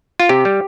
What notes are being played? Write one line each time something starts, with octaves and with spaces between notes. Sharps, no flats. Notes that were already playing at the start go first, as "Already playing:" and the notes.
F4
C3 G4
G3